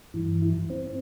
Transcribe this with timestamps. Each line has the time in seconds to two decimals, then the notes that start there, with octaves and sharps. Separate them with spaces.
0.14 G2 E3
0.42 E4
0.70 C4